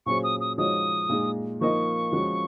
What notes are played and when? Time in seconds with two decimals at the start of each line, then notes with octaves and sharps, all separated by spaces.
0.06 A#2 F#3 C#4 G#4 C5 C#6
0.24 D#6
0.40 D#6
0.58 F3 G#3 D#4 F#4 C#5 D#6
1.09 A#2 G#3 D#4 G#4
1.61 F3 A#3 D#4 A#4 D#5 C#6
2.12 F3 G#3 C#4 F#4